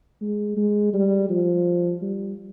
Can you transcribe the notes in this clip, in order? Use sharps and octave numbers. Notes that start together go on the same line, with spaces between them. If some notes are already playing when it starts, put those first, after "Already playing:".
G#3
G#3
G3
F3
G3